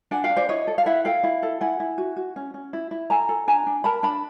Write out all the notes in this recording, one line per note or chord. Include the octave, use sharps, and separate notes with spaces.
D4 F#5 G#5
F5 G5
D4
C5 D5
E4 C#5 D#5
A4
F5
E4 E5 F#5
A4 F5 G5
E4
A4
E4 F#5 G#5
E4
F#4
F#4
C#4
C#4
E4
E4
A4 G#5 A#5
A4
D4 G#5 A#5
D4
A#4 A5 B5
D4 A5 B5